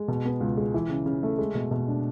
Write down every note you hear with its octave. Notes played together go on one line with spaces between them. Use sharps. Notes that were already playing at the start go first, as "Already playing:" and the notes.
Already playing: G#3
B2
B3
C#2
G#3
E3
C#3
C#3
A3
G#3
B2
B2
D4